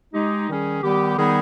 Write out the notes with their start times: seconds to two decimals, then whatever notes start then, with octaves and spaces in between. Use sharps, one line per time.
0.14 G#3 D#4 G4
0.49 D#3 G3 C#4 G#4
0.83 D#3 G3 B3 G4
1.17 D#3 G3 B3 D#4 G#4